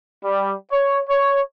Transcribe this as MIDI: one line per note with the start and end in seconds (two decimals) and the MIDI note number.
0.22 0.53 55
0.71 1.00 73
1.08 1.40 73